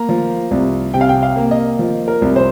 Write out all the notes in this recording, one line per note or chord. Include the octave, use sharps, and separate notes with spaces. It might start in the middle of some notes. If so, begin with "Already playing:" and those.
Already playing: A#3 A#5
F3
C2
C3 G5
F5
G5
F5
A#3
D#5
F3
A#4
C2
C5